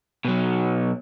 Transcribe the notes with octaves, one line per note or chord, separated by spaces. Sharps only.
B2 F#3